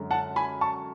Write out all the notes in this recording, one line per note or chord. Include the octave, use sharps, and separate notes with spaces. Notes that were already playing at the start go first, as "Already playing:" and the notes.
Already playing: F#2 D3 G#3
F#5 A5
G#5 B5
A5 C#6